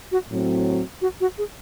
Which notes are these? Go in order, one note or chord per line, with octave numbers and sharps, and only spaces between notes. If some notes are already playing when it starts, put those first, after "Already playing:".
F#4
A2 F#3 C4
F#4
F#4
G#4